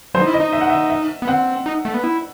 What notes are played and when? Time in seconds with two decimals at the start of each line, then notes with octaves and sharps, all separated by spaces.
0.14 F#3 C5
0.21 D#4
0.27 E4
0.34 D#5
0.40 D#4
0.53 E5
0.61 F#5
0.70 E5
0.90 E5
1.22 B3
1.27 C4 F#5
1.66 D#4
1.85 A3
1.94 B3
2.04 E4